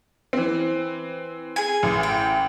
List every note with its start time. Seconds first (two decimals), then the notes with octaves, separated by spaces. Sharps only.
0.33 E3 C4
1.56 G#4 G#5
1.83 A1
2.03 G5